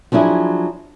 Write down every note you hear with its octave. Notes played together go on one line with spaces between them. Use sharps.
F3 F#3 D4 E4 G#4